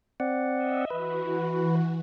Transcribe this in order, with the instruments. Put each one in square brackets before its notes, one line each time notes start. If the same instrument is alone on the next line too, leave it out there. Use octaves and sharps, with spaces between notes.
[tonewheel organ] C4 D5 F#5
[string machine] D#5 E5
[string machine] E3 F#4 [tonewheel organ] B4